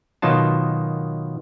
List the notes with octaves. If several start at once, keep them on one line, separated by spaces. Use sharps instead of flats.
B2 D#3 F#3 F4 A5